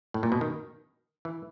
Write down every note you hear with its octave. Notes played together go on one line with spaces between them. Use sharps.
A2
A#2
B2
D#3
E3